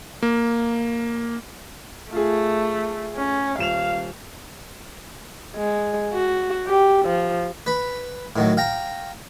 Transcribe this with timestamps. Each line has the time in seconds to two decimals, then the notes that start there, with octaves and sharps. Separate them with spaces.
0.23 A#3
2.12 A3 F4 G#4
3.16 C#4
3.58 D#1 F5 E7 F7
5.55 G#3
6.13 F#4
6.67 G4
7.05 F3
7.66 B4 B5
8.36 A2 D#3 F#3
8.57 F5 G5 A#5